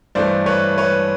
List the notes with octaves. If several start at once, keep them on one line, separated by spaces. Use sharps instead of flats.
G2 E3 A3 C5 D5
B4 C#5
B4 C#5